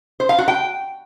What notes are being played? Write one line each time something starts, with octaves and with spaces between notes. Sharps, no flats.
C5
F5
F#4
G5